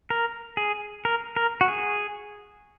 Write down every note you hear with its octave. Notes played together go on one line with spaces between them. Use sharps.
A#4
G#4
A#4
A#4
F#4
G#4